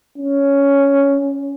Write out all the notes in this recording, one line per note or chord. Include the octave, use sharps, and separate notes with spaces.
C#4